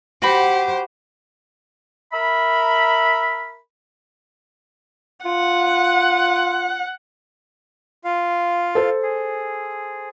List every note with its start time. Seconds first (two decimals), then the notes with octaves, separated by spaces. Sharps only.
0.22 F#4 G4 C5 F#5 B5
2.13 A#4 E5 B5
5.25 F4 F#5
8.04 F4 F5
8.75 A4 C5
9.03 G#4